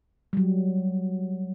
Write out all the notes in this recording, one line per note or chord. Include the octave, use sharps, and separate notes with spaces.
F#3 G3